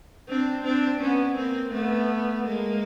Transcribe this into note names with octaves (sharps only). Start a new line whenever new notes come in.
C4 D4
C4 D4
B3 C#4
A#3 C4
A3 B3
G#3 A#3